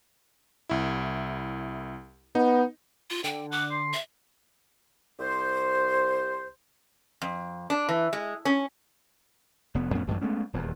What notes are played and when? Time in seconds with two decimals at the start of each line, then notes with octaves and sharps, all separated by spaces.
0.69 C2 E4
2.35 B3 D#4
3.10 F4
3.24 D3 G5
3.52 F#5 D6
3.71 C6
3.93 E5
5.19 C2 G4 C5
7.22 F2
7.70 D4
7.89 E3
8.13 G#3
8.45 C#4
9.75 F1 B3
9.95 F2 A2 B3 C#4
10.07 D1 A1 F#2
10.21 G#3 A3 B3 C#4
10.53 D#1 E2